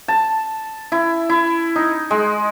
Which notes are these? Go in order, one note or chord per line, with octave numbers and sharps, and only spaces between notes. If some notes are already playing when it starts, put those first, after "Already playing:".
A5
E4
E4
D#4
G#3